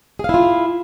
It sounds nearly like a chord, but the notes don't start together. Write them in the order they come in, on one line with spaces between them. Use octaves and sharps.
G#4 F5 E4 F4